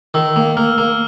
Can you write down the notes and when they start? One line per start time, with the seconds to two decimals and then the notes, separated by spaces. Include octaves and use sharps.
0.14 D#3 E6
0.36 A#3
0.57 A#3 F6
0.78 A#3